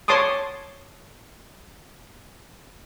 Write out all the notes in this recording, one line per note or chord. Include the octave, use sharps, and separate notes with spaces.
C#5 A5 C6 D6 D#6